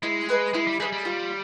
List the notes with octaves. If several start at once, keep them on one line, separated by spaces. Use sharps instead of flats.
G#3 E4
G#4 B4 D#5
G#3 E4
G3
G3 G#4 B4 D#5
G3
F4